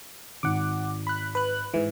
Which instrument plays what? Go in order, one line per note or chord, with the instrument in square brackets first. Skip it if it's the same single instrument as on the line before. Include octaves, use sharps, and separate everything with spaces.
[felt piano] G#1 [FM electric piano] F#5 D6
[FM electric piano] B5 F#6
B4 F#6
G#2 E3